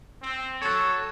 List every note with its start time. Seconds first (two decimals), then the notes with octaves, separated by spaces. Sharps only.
0.22 C4
0.62 F#4 A4 C#5